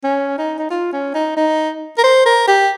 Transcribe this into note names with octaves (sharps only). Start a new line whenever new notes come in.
C#4
D#4
D#4
F4
C#4
D#4
D#4
A#4
C5
A#4
G4